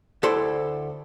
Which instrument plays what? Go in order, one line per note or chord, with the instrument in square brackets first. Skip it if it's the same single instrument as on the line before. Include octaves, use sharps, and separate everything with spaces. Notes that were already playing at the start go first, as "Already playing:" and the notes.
[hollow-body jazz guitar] D2 E4 A4 C5 D5 C6